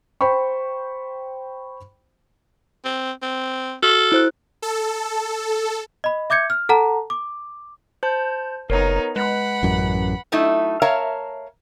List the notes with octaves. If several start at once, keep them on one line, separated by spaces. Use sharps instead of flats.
C5 G5 B5 C#6
C4
C4
F#4 A4 F6
E4 C5 F#6
A4
D#5 B5
E5 D6 G6 G#6 C#7
F6
A4 F#5 A5 A#5
D6
C5 A5 G6
F#1 B3 D#4 A#4 C#5 A#5
G#3 B4 F#5 B5
A1 F#2
F#3 A3 D#4 E4
A#4 C#5 E5 F5 A5 A#5